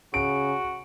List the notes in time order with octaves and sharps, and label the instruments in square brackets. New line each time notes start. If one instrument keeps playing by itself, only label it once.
[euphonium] C#3 [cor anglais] F#4 [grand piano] D7